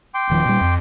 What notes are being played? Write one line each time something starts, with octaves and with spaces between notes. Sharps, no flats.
G5 C6 D6
D#1 D#3 F3
A#2 G3
F2